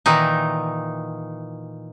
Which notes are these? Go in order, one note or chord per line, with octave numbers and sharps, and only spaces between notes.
A#2 D#3 E3 D#4